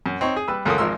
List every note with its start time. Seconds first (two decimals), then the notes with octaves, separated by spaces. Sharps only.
0.06 F#2
0.21 C4 D#4 C#5
0.36 G#4
0.48 G3 B4 E6
0.65 C#2 F#2 A4 A#4 D#6
0.78 G#1 F3 G#3 A#4 C6 E6